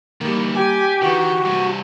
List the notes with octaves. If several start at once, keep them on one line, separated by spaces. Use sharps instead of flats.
D#3 E3 G3 A#3
G4 G#5
D#3 E3 F#4
G2 C3